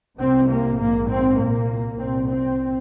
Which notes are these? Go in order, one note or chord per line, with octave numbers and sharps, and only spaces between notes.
C2 C3 C4
A#3
A#1 G#2 A#3
C4
C2 A#2 A#3
C2 A#2 C4
C4